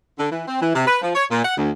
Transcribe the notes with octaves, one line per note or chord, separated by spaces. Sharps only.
D3
E3
C4
E3
C3
B4
F3
C#5
A#2
F#5
D2